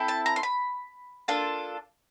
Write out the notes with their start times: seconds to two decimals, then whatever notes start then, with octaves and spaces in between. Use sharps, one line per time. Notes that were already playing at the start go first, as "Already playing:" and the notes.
Already playing: C4 E4 A4
0.08 A5
0.26 A#5
0.36 C6
0.43 B5
1.28 A#3 D4 F4 A4